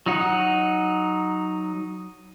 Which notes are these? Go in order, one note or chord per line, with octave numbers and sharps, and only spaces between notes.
F#3 D#4 F#5